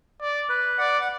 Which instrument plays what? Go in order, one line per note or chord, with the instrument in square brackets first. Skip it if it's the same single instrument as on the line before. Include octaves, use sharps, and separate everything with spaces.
[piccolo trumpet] D5
[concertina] B4
[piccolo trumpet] D5 [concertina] F#5
[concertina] F#5